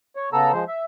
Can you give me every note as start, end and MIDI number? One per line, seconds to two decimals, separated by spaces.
0.16 0.29 73
0.33 0.52 49
0.33 0.52 59
0.33 0.52 69
0.33 0.52 82
0.33 0.52 88
0.53 0.64 53
0.53 0.64 56
0.53 0.64 72
0.68 0.85 76